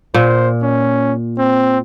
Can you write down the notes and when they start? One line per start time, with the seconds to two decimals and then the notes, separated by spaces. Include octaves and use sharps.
0.14 A#2 C5
0.63 C#4
1.38 C4